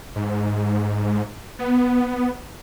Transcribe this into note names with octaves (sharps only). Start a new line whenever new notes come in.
G#2
B3